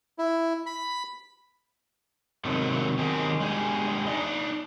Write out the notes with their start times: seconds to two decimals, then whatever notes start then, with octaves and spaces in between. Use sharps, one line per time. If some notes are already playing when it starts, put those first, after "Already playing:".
0.19 E4
0.66 B5
2.45 C3 D#3 F#3 G#3 A3 C4
2.99 D#3 F#3 C4 D#4 G4 G#4
3.40 G#3 D4 G4 G#4
4.07 D4 D#4 D5 D#5